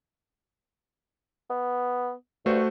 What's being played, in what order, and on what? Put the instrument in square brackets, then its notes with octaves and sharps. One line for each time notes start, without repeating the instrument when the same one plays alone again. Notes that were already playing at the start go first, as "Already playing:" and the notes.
[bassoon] B3
[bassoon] G2 [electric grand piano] A3 F#4 C5